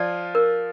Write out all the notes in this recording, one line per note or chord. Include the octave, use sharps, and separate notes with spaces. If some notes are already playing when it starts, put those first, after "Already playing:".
Already playing: F3 F4 D5
A#4